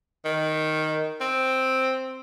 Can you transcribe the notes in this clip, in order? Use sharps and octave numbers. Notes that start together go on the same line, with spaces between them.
D#3
C4